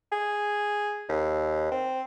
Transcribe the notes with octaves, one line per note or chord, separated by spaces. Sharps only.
G#4
D#2
C4